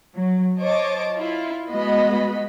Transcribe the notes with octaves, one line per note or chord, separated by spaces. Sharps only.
F#3
C5 C#5 D#5 A5 D6
E4 F4
G#3 B3 F#4 D#5 B5